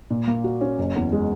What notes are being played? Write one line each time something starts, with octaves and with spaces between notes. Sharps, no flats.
A#2
A#3
F#4
C#4
F#1
E2
G#3